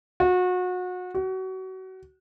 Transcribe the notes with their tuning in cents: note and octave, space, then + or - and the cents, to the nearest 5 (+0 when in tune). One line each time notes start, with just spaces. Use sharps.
F#4 -30
F#4 +30